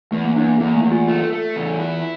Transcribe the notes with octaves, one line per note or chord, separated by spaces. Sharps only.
E2 A3
A#3
E2 D4
A#3
E2 A#3
A3
E2
F4
A3 F4
A3
E2
E4